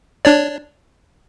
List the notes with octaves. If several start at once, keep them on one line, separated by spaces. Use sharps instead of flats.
D4 C#5 D5